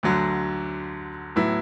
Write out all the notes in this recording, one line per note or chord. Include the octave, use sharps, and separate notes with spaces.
D2 D3 F#3
A2 F#3 B3 E4